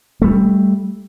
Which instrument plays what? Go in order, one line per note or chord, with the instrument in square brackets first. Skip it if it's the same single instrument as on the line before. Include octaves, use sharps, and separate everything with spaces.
[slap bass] G3 A3